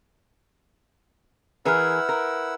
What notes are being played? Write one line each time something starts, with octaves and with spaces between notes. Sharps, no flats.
E3 E4 G#4 A#4 B4 F#5 E6 F6
A#4